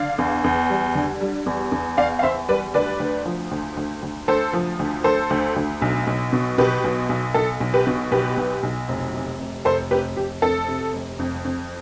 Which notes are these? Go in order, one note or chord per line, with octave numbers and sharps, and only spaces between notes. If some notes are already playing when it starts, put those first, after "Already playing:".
Already playing: D3 D5 F5
E2
E2
G3
D3
G3
E2
E2
E2 D5 F5
F5
E2 C5 E5
G3 B4 D5
D2 B4 D5
D2
F3
D2
D2
D2
D2 A4 C5
F3
D2
D2 A4 C5
D2
D2
B1
B1
B2
B2 G4 B4
B1
B1
B1 A4
B1
G4 B4
B2
B1 G4 B4
B1
B1
F1
C3
F1
F1 A4 C5
F1 G4 B4
F1 G4
F2 A4
C3
F1
F2
F2